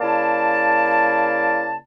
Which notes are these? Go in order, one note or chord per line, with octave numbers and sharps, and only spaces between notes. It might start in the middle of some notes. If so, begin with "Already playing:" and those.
C#3 A#3 E4 D5 A5